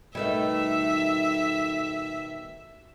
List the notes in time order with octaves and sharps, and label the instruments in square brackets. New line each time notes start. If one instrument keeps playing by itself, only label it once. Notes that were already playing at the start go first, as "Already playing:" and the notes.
[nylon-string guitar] B2 D#3 [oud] G3 A3 [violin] E5